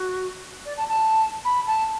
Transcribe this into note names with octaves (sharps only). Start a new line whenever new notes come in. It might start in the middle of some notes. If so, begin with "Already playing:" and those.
Already playing: F#4
D5
A5
A5
B5
A5